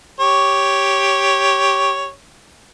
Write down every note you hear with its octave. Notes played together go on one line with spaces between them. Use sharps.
G4 C#5